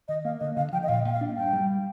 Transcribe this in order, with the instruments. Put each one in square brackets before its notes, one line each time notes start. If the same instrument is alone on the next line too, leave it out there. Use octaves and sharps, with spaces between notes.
[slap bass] D#3 [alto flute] D#5
[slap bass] A#3 [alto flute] F5
[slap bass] D3 [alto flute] D#5
[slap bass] D3 [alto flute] F5
[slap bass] F3 [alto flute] G5
[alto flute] D#5
[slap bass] A#2 [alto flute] F5
[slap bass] A#2 [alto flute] G5
[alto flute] F5
[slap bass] D4
[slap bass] G2 [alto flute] G5
[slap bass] G3